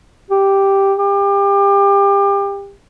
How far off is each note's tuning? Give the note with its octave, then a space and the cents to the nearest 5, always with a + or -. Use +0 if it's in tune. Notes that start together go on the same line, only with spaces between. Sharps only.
G4 +0
G4 +30